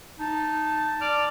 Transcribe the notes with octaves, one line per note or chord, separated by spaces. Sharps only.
D#4 A5
D5 F6